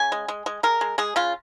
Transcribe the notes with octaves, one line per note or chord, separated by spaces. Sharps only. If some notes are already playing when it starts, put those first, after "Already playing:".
Already playing: C#3 G#5
G#3
G#3
G#3
G#3 A#4
G#3
G#3 G#4
C#3 F4